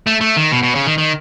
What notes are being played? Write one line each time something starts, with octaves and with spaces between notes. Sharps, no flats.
A3
A3
D#3
B2
B2
C#3
D#3
D#3